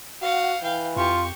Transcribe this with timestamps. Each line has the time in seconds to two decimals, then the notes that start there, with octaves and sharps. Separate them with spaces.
0.22 F#4 F5 F#5
0.63 E3 F5 G5
0.96 F2 F4 G4 C#6